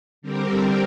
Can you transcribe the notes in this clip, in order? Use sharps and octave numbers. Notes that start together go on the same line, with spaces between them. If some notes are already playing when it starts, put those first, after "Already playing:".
D3 G3 C4 G4 A#4